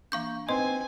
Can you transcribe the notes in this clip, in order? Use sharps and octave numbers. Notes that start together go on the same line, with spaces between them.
E3 A#3 D4 F5 C#6 G6
C4 D#4 B4 D#5 G#5 C6